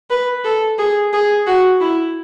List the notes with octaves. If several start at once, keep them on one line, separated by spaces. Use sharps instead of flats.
B4
A4
G#4
G#4
F#4
E4